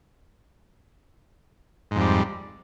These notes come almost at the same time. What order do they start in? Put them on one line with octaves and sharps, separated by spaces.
G#2 F2 G3